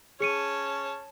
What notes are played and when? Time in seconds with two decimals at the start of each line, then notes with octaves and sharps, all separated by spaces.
0.20 C#4 G#4 C#5 A5 C#7 D#7